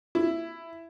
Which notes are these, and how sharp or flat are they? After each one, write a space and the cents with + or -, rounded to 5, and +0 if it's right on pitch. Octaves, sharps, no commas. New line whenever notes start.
E4 +10